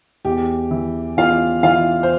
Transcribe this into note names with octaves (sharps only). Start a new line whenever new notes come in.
E2 G4
E3
E2 F4 F5
E3 F4 F5
C5